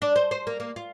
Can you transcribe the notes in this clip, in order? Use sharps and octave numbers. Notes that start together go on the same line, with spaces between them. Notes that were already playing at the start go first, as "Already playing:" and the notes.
D4
C5
C5
A#3
A#3
F4